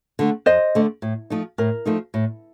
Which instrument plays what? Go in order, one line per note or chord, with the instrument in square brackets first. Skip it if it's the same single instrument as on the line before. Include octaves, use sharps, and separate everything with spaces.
[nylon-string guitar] D3 A3
[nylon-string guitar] F2 [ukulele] C5 D#5
[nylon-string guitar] D3 A3
A2
F3 A3 D#4
[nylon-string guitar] A2 [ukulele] A#4
[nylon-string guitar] F3 A3 D#4
A2